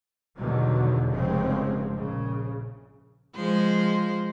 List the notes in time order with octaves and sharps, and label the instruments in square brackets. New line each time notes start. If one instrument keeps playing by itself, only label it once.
[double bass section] E2 G2 B2 D3 D#3 F#3
F1 G2 C#3 F3 G#3 C4
A#1 C#3
[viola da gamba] F3 G#3 C5